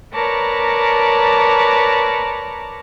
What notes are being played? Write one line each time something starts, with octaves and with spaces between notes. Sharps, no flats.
A#4 B4 C#5 D5 A5 A#5